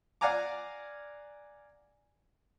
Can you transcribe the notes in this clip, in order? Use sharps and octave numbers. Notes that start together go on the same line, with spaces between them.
D5 F5 F#5 G#5 A#5 D6